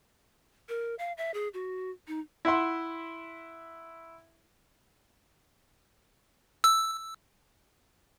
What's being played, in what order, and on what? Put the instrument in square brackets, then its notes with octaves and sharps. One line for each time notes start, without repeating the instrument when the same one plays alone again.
[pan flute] A#4
F5
E5
G#4
F#4
D#4
[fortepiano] E4 E5 F#5 C6
[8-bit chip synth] E6